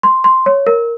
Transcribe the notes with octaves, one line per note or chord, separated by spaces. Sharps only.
C6
C6
C#5
A#4